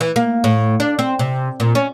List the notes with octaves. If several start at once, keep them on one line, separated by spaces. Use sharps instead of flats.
E3
A#3
A2
D4
C4
C3
A#2
C#4